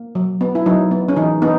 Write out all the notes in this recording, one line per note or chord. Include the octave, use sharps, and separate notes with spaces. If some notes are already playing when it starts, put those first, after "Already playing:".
Already playing: A#3
F#3
B3
E4
F#3 D#4
B3
C#4
E3 D#4
B3 D#4